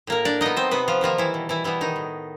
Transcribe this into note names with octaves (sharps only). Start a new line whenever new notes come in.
A2 A#3 A#4
D4 D5
F#3 B3 D#4 D#5
C4 C5
C3 B3 B4
F3 F4
D#3 F3 G3 A#3 F4
E3 E4
B2
E3 E4
E3 G3 B3 E4
D#3 D#4
A2